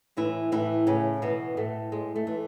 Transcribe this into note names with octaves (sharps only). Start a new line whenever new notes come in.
A2 E3 E4
A2 E3 E4
A2 C#3 C#4
B2 E3 B3
A2 A3
A2 G#3
A3
E3